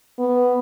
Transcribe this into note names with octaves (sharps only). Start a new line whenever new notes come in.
B3